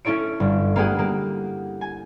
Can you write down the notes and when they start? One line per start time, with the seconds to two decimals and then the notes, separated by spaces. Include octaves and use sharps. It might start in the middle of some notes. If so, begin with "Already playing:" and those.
0.05 C#4 E4 A4 C#5 D7
0.40 G1
0.76 A#3 B3 G4 G#4 F#5
0.99 A#3
1.81 G#5